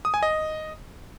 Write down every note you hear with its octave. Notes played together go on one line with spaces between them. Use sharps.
D#6
G#5
D#5